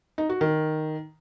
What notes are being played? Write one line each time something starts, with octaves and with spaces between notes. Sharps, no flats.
D#4
F#4
D#3